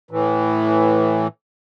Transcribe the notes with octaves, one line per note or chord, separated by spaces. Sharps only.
A2 E3